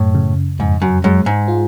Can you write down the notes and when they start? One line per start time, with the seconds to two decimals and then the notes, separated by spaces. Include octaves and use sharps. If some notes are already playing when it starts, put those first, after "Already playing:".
Already playing: F#2 A2
0.15 C#3
0.59 F2 G#2
0.82 F#2
1.04 F#2 G#3
1.26 G#2
1.48 F4